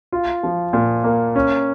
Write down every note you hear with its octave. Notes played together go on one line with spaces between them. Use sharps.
F4
F3
A#2
A#3
C#4